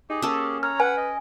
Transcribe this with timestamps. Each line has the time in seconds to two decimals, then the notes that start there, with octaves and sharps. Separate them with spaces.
0.10 D#4 G4 G#4
0.22 A#3 C#4 A4
0.63 C#5 A#5 F6
0.80 B4 F#5 G#5
0.97 D#5